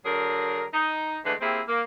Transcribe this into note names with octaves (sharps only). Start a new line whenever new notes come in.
D3 F#3 G#4 A#4
D#4
D3 E3 G#3 A3 B4
A#3 C4 E4 G4 G#4
A#3